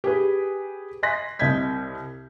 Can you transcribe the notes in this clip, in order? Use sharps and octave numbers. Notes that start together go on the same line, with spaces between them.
G4 G#4 B4
D#5 G#5 C6 F#6 A#6 B6
C2 D#5 G6 G#6 B6